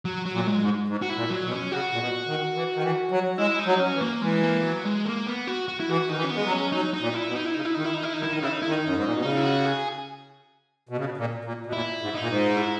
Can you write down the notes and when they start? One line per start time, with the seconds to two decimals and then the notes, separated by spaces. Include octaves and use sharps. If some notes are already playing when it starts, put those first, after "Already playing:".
0.05 F#3
0.26 F#3
0.32 A#2
0.47 G#3
0.61 G#2
0.88 G#2
1.02 F#4
1.10 E4
1.16 A#2
1.30 F#3
1.44 B2
1.51 C#4
1.72 C#3 F#4
1.93 A#2
2.00 B2
2.27 D#3
2.56 E3
2.75 D#3
2.83 E3
3.11 F#3
3.38 G#3 E4
3.60 D#4
3.66 F#3
3.80 C#4
3.95 E3
4.01 A#3
4.22 E3 G#3
4.43 A#3
4.63 F#3
4.85 G#3
5.05 A#3
5.26 B3
5.47 F#4
5.68 F#4
5.80 E4
5.89 E3 F#4
6.09 D#3 D#4
6.16 E3
6.24 C#4
6.31 G#3 B3
6.45 F#3
6.51 C#4
6.72 F#3 D#4
6.93 D#4
7.01 A#2
7.14 E4
7.28 B2
7.35 D#4
7.45 E4
7.54 C#3 D#4
7.65 E4
7.74 D#3 D#4
7.84 E4
7.94 E3 D#4
8.03 E4
8.14 D#4
8.19 D#3
8.23 E4
8.33 D#3 D#4
8.40 C#3
8.43 E4
8.52 D#4
8.62 D#3 E4
8.72 D#4
8.85 F#2
8.95 G#2
9.04 A#2
9.13 B2
9.22 C#3 D#4
9.37 E4
9.44 F#4
9.65 G#4
10.89 B2
10.97 C#3
11.05 B2
11.17 A#2
11.45 A#2
11.66 B2
11.73 A#2 E4
12.01 G#2
12.15 A#2 D#4
12.28 G#2
12.56 E4